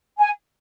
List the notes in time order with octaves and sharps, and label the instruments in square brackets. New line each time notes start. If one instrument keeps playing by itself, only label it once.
[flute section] G#5